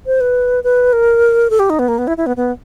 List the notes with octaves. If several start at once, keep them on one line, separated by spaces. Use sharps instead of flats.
C5
B4
B4
A#4
A4
G4
D#4
B3
A#3
B3
E4
E4
B3
B3